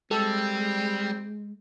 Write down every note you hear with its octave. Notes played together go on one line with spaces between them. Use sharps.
G3 G#3 C4 A4